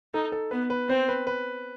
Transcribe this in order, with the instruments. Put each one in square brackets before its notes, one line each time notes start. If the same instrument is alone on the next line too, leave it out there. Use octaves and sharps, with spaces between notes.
[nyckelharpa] D#4 [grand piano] A4
[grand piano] A4
[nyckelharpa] B3 [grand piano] B4
[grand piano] B4
[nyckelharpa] C4 [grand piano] C5
[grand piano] B4
B4